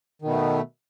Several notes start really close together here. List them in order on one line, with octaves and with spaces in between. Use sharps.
D#3 B2 B3 A3